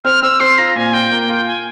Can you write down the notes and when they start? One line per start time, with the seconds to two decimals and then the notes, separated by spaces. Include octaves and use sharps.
0.04 C4 F6
0.22 C4 E6
0.40 C4 C6
0.58 F4 A#5
0.76 A#2 G#5
0.93 F4 G5
1.11 A#3
1.29 F4
1.46 G#5